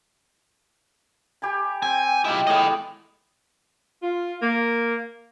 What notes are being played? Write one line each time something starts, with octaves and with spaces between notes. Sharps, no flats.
G4 G#5 B5
C4 G#5
B1 G#3 E4 F4 G4
A2 G#3 B3 D#5 G5
F4
A#3